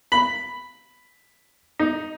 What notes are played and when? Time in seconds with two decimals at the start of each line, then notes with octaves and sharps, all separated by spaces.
0.12 B5
1.79 D#4